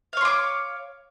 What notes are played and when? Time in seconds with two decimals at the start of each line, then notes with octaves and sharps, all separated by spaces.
0.13 F5
0.17 C#5
0.21 C6
0.25 D6